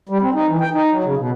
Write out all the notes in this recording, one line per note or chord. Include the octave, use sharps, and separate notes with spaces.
G3
C4
D#4
E3
G5
D#4
F#3
C#3
B2